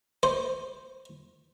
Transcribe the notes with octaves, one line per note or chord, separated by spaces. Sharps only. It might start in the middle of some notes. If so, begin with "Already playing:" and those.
C5